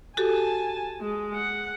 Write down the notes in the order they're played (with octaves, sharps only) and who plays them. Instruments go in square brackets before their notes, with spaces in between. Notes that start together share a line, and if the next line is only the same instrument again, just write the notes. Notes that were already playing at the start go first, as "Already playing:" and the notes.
[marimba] F#4 G4 A4 [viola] G#5 A5
[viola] G#3
F#5